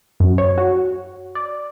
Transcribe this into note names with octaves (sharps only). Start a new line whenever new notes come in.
F#2
C#5
F#4
D5